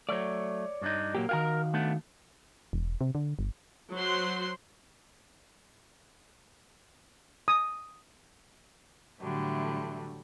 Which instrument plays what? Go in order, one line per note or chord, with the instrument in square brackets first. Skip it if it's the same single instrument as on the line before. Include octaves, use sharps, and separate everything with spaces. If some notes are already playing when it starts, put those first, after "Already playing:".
[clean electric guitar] F#3 A3 [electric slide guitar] C#5 D5
[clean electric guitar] G2 D4 D#4
[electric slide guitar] A#2 F#3 G4 [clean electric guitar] A#3
[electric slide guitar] D#3 F#4 F5 [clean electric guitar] A#4 G5 A#5
[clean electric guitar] A3 B3 D4
[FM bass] E1
C3
D3
G1
[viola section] F#3 C5 F#5 C6
[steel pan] D#6
[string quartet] A2 D3 E3 F#3 G3 A3